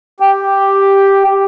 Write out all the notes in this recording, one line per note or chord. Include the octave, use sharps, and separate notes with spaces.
G4